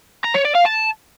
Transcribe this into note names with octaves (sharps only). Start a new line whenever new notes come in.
A#5
C#5
D5
F5
A5